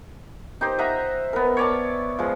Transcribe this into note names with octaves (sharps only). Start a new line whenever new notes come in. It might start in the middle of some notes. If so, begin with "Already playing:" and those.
D#4 G4 C5
D#5 E5 F#5 A#5
B3 A#4
C#5 D5 A5
F3 G#3